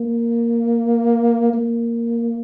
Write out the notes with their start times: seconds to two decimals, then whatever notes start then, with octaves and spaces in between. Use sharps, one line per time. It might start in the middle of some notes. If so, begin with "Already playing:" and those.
Already playing: A#3
1.53 A#3